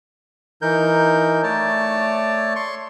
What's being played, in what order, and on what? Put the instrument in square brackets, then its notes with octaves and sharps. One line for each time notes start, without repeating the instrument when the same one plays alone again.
[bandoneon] E3 D#4 A#4 G6
A3 C#5 D5 A5
C6 C#6